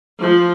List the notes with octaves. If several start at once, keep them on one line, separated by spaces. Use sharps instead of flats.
F3